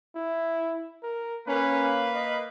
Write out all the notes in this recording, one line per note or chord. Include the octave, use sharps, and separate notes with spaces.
E4
A#4
A#3 C#4 B4
D#5